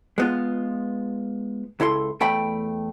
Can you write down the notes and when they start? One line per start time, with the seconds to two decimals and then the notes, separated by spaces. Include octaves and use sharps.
0.18 G#3 B3 F4
1.80 C#2 E4 A4 C6
2.21 E2 A3 G5 B5